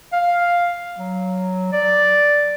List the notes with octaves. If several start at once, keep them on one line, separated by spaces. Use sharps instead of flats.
F5
F#3
D5